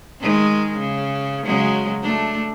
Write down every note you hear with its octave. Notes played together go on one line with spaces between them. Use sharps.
D#3 G#3
C#3
C#3 F#3 G#3
A3 D4